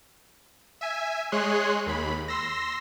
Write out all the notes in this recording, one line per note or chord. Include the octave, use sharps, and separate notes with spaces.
E5 G#5
G#3 G#4 C#5 C6 F#6
D#2 B5
C6 E6 A#6